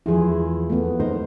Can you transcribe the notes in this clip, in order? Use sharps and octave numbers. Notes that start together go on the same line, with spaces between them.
E2 F3 E4 G#4
A3 B3
D#3 A3 D#4 A#4 C5